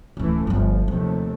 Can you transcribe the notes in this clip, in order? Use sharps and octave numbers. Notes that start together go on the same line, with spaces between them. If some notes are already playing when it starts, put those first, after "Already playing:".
D1 A2 E3 A3 C#4
G1 F3 B3
D#2 C3 F3 A3